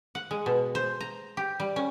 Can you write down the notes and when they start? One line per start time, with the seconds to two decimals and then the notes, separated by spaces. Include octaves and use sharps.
0.15 F#5
0.31 G#3
0.46 B2
0.75 C5
1.00 A#5
1.37 G4
1.60 G3
1.76 C#4